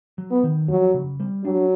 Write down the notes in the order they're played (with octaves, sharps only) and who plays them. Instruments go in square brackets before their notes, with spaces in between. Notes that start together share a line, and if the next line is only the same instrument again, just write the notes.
[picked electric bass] F#3
[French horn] B3
[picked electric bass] D#3
[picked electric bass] F2 [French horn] F#3
[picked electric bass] C#3
G3
[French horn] F#3 [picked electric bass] D4